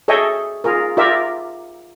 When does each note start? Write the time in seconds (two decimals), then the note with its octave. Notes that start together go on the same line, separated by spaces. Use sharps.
0.08 G#4 A4 C#5 D#5 E5 G5
0.64 F4 G#4 A#4
0.97 F4 G4 A#4 D5 E5